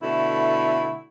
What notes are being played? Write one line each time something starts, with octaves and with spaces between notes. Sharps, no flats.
B2 D3 A3 E4